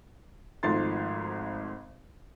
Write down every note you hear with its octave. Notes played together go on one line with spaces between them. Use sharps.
G#1 G#2 F3 A3 C6 A6